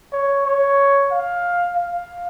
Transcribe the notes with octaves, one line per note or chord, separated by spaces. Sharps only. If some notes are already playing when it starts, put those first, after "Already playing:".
C#5
C#5
F5
F5